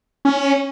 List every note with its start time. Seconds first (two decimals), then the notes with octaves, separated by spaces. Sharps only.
0.25 C#4